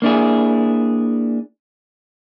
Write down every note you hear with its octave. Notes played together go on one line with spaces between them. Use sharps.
A#3 D4 E4 G#4